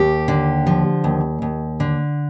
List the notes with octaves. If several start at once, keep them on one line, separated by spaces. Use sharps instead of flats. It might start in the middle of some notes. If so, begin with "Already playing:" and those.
Already playing: D#2 G4
D3
F3
D#2
D#2
D3